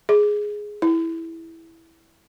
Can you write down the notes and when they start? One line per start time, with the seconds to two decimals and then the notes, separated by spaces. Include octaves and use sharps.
0.09 G#4
0.82 E4